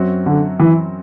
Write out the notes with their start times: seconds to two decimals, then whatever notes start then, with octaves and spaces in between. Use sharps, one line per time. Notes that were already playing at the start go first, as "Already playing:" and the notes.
Already playing: F#2 F#3 C4 F#4
0.26 D3
0.60 E3